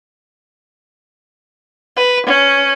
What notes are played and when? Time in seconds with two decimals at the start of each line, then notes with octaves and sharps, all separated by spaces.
1.97 B4
2.27 C#4